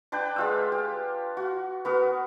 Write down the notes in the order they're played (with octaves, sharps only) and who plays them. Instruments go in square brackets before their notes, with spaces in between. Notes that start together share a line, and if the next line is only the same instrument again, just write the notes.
[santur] D4 B4 D5 G5
G#3 F4 E6
G4
F#4
B3 F#4 A#4